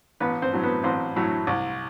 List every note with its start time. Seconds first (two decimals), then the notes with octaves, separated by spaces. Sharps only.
0.20 A1 B3 B4
0.42 C4 C5
0.53 A2 F#3
0.63 B3 B4
0.84 A1 C4 C5
1.16 A2 F#3
1.47 C2